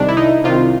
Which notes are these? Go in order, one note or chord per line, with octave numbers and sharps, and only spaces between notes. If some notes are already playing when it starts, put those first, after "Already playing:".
Already playing: C2 C3 D#3 D4
E4
D#4
C2 C3 D#3 F4